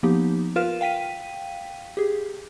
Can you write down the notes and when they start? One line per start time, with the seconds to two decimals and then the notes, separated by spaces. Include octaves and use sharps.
0.03 F3 A#3 B3 D#4 G4
0.56 F4 A#4 B4 F5 F6 E7
0.81 F5 G5 B6 D#7
1.97 G4 G#4